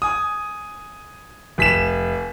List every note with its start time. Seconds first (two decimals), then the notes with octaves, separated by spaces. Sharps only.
0.02 G#5 D#6
1.58 F1 B6 E7